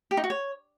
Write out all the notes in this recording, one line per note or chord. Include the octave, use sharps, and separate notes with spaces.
G4
D#4
F#4
C#5